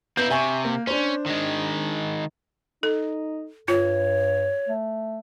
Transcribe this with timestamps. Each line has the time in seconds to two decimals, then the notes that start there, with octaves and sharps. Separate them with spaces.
0.17 A#3 B3 D4 E4 G6
0.30 C3 E5 G#5 C#6
0.65 A#3
0.87 C#4 D4 C5
1.26 D#3 G#3
2.83 D#4 A4
3.68 G2 F4 C#5
4.69 A3